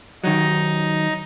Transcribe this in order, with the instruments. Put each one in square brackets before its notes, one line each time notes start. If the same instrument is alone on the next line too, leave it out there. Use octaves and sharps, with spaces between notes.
[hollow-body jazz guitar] D#3 F#3 [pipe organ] D#4